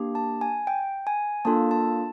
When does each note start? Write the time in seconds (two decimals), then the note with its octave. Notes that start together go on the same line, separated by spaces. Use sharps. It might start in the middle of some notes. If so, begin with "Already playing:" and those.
Already playing: A#3 D4 G4
0.15 A5
0.41 G#5
0.67 G5
1.07 G#5
1.45 A#3 D4 F4 A4 A5
1.71 A5